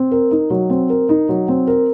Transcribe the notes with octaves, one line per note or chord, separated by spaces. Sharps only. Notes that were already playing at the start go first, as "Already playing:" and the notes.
Already playing: C4
A#4
D#4
F#3
C4
A#4
D#4
F#3
C4
A#4